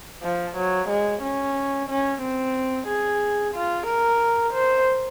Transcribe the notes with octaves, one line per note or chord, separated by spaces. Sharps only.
F3
F#3
G#3
C#4
C#4
C4
G#4
F4
A#4
C5